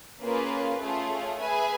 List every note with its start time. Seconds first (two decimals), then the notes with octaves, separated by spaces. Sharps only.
0.22 A#3 C#4 F4 G#4 B4
0.81 A3 C#4 F4 G#4
1.39 G#4 B4 E5 G#5